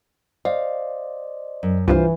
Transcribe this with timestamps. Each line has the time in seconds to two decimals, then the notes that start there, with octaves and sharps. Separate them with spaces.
0.45 C5 D5 D#5 F5
1.63 F#2
1.88 C2 G2 E3 F4 C5